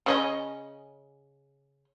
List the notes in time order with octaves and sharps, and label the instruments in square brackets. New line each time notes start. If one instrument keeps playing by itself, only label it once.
[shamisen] C#3 C#4 D#5